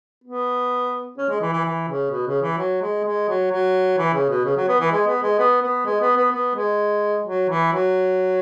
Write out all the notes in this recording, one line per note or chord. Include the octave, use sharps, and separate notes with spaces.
B3
C#4
G#3
E3
E3
E3
C#3
B2
C#3
E3
F#3
G#3
G#3
F#3
F#3
E3
C#3
B2
C#3
F#3
B3
E3
G#3
B3
G#3
B3
B3
G#3
B3
B3
B3
G#3
F#3
E3
F#3